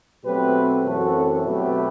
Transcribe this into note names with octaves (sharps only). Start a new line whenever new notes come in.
B2 F#3 A3 C4 G4 B4
F#2 E3 A3 C4 F#4 A4
B2 F#3 A3 C4 G4 B4